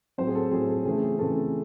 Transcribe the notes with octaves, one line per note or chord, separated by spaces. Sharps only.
A2 F#3 C4 C5
G#4
A4
A2 F#3 C4 G#4
A4
C#3 E3 A3 C4 G#4
G#4
C#3 E3 A3 C4 A4